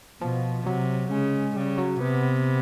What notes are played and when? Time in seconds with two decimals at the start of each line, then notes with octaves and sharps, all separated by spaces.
0.21 B2 F3
0.66 C3 F#3
1.11 C#3 G#3
1.56 C#3 G3
1.78 F#3
2.01 C3 B3